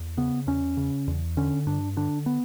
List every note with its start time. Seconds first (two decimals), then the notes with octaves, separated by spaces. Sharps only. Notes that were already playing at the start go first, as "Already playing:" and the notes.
Already playing: E2
0.17 C#3 B3
0.47 E2 C#4
0.77 C#3
1.08 E2
1.37 D3 C#4
1.67 G2 D4
1.97 D3 D4
2.26 B3